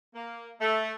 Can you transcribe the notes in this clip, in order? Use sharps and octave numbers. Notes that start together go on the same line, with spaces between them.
A#3
A3